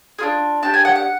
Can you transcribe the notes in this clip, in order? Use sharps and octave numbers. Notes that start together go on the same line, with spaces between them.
D4 F4 G#4
D4 G4 A5
G#5
F#5
F#5